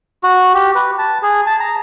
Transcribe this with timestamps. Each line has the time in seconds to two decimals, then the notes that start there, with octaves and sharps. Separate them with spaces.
0.23 F#4
0.54 G4
0.75 B4
0.98 A5
1.22 G#4
1.47 A5
1.60 A#5